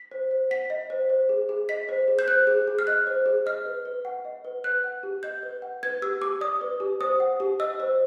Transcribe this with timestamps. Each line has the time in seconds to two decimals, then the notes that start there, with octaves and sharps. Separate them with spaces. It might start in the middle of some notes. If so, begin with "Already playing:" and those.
Already playing: B6
0.11 C5
0.31 C5
0.51 F#5 B6
0.70 D#5
0.90 C5
1.10 C5
1.29 G#4
1.49 G#4
1.69 D#5 B6
1.89 C5
2.08 G#4
2.19 G6
2.27 C5 F#6
2.47 G#4
2.68 G#4
2.79 F6
2.87 D#5 F#6
3.07 C5
3.26 G#4
3.46 D#5 F6
3.66 B4
3.85 B4
4.05 F#5
4.25 D#5
4.45 B4
4.64 B4 F#6
4.84 F#5
5.03 G4
5.23 D#5 G6
5.43 B4
5.62 F#5
5.83 B4 G#6
6.02 G4 E6
6.21 G4 D6
6.41 D5 D#6
6.61 B4
6.80 G4
7.01 C5 D#6
7.20 F#5
7.40 G4
7.60 D#5 E6
7.80 C5